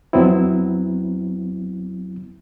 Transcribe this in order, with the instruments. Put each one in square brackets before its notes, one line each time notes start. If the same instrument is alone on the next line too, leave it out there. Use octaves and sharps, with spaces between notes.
[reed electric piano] F2 F#3 B3 C4 E4